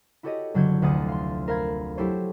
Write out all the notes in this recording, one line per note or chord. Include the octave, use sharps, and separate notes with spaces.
E4 F#4 G4 A4 C#5 D#5
F#1 D3 F#3 F#4 G6 G#6
F1 D2 C5 F#5 D#6 A6
F5 C6
A#4 C5 F5 B5 G#6
F#3 E4 G4 A4 C5 C#5